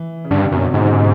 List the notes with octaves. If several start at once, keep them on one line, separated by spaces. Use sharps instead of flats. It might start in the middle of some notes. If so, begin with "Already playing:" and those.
Already playing: E3
C#3
G2 D3
C3
F#2 B2
C3
G#2 D3
C#3
C3